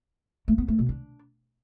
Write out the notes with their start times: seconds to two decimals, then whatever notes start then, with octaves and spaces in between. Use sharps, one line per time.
0.48 A3
0.58 B3
0.68 A3
0.79 B2
0.89 D4